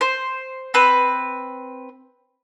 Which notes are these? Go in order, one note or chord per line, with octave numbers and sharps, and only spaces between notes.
C5
C4 B4